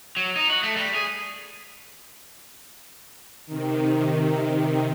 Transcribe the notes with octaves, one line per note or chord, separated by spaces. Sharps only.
F#3
D#4
F#4
A3
G3
G#4
C3 D#3